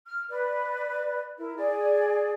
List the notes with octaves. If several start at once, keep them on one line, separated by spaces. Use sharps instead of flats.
F6
B4 D5
E4 A#4
G#4 D5